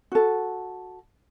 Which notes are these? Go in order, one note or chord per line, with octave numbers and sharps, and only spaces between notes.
F#4 A4